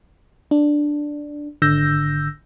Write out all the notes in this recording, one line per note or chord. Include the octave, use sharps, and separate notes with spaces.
D4
G#1 D3 E6 G6 A#6